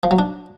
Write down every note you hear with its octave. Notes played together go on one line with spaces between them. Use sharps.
F3
F#3
D4